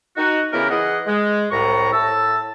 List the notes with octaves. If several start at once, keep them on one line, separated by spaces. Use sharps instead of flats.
D#4 F#4
C#3 E3 B3 E4 G4 A#4
E3 G#4 D#5 F#5
G#3
C2 A2 A#5 C#6
A2 A5 E6